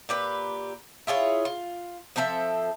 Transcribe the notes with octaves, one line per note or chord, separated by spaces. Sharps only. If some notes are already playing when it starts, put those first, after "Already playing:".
A#2 G4 B4
E4 F4 G#4 C#5
F4
F3 C4 A4 E5